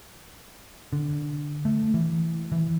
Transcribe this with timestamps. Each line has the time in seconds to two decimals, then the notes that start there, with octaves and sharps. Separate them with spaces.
0.93 D3
1.65 A3
1.94 E3
2.52 E3